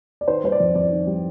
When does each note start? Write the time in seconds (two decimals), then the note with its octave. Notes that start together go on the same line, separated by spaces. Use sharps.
0.21 D5
0.27 D#3 C5
0.44 G3 C5
0.52 D5
0.60 F2
0.75 F2 D5
0.92 D#3
1.07 G3